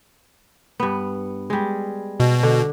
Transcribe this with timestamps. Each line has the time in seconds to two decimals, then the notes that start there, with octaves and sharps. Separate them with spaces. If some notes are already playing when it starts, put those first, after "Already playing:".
0.80 G2 B3
1.50 G3 G#3
2.20 B2
2.43 D3